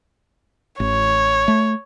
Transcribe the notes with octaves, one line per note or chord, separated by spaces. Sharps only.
A1 C#5
A3